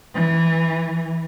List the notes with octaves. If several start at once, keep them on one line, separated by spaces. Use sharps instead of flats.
E3